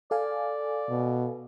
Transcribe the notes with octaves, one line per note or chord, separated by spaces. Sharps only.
A4 D5 F5 G#5
B2